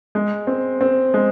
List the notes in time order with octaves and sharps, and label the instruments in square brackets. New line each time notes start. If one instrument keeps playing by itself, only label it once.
[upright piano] G#3
C4
C4
G#3